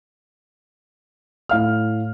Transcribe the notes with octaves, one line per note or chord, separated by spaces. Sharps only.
A2 F5 F6